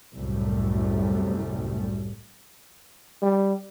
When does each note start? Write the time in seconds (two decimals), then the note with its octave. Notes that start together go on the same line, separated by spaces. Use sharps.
0.15 C2 F#2 A2 G3 A3
3.23 G3